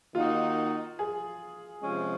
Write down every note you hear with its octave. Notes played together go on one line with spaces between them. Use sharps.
D#3 A#3 D#4 F4 F#4
G#4
C3 F3 G#3 C#4